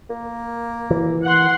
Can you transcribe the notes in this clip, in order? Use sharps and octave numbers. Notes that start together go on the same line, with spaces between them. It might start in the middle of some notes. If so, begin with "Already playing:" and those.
A#3
E3
F#5 C6